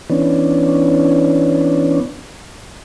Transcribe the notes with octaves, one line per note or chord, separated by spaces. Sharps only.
E3 B3 C#4 D4